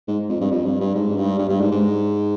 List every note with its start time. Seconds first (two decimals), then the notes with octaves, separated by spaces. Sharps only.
0.08 G#2
0.29 F2
0.40 G2
0.52 F2
0.66 G2
0.80 G2
0.95 G#2
1.17 G2
1.38 G2
1.49 G2
1.61 G#2
1.71 G#2